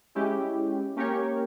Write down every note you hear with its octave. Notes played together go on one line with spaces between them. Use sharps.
G#3 C#4 E4 G4
A#3 C#4 G4 A#4 C#5